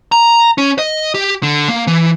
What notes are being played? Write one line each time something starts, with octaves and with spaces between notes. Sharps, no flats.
A#5
C#4
D#5
G4
D3
A#3
E3